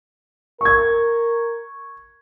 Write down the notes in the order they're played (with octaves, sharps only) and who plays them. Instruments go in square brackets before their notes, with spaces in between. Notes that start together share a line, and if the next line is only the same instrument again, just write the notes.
[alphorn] A#4 [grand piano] C#6 G#6